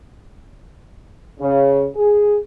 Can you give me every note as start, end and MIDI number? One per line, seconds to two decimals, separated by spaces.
1.40 1.85 49
1.96 2.37 68